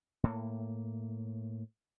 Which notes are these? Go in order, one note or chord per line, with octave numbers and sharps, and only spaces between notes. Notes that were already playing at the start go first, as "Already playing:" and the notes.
A2 A#3